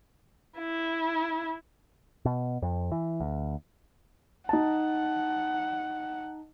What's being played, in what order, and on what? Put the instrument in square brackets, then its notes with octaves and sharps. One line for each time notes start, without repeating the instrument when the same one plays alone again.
[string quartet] E4
[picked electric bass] B2
F2
E3
D2
[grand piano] D#4 A5 [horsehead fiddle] F#5